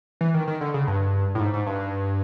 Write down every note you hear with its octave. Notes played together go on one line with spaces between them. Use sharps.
E3
D#3
D#3
D3
C#3
G2
A2
G#2
G#2
G2